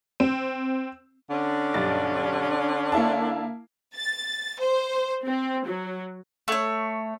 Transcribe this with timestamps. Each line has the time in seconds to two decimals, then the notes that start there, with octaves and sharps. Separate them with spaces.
0.20 C4
1.29 D3 C#4 D4
1.74 B1 G2 A6
2.92 A#3 E4 A5
3.94 A6
4.58 C5
5.26 C4
5.66 F#3
6.48 A3 C#5